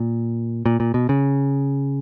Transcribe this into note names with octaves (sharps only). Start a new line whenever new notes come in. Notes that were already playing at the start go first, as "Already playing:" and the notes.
Already playing: A#2
A#2
A#2
B2
C#3